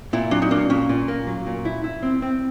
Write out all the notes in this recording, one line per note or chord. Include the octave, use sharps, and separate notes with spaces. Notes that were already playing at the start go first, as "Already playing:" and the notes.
A#2 E4
F#3 D4
D#4
A#3 D4
A#2 C#4
A#2
A#3
F#3
A#2
E4
E4
C4
C4